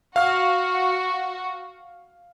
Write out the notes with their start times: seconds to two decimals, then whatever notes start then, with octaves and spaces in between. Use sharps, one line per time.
0.16 F#4 F5 F6